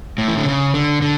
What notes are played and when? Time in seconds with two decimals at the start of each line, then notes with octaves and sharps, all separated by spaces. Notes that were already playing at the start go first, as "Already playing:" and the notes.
0.18 A2
0.28 E3
0.37 D3
0.46 C#3
0.74 D3
1.02 D3